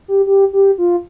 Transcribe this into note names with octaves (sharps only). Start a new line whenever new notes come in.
G4
G4
G4
F4